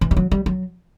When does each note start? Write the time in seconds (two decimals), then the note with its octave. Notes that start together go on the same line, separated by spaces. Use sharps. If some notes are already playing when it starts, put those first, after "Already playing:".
0.01 E3
0.11 G3
0.17 F#3
0.31 G3
0.46 F#3